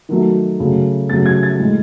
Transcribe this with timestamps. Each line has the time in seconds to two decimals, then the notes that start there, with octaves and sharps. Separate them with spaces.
0.09 D#3 F#3 A3
0.60 C#3 F#3 A3
1.10 C#3 F#3 A3 A6
1.26 G#6
1.43 A6
1.59 A2 G#3